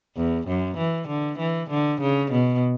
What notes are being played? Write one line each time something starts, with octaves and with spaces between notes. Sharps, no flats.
E2
F#2
E3
D3
E3
D3
C#3
B2